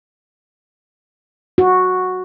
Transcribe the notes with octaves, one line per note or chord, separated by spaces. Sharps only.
F#4